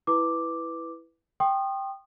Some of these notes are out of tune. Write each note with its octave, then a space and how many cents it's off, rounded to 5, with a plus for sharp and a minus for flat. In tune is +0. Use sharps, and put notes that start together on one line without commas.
E4 +0 B4 +0 D6 +0
G5 +0 C6 +35 D#6 -25